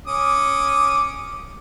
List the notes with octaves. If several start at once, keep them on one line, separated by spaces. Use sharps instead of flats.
C#4 D6 D#6